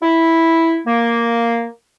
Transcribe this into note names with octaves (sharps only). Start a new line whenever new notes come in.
E4
A#3